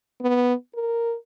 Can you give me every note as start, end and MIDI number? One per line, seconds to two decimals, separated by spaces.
0.22 0.54 59
0.74 1.15 70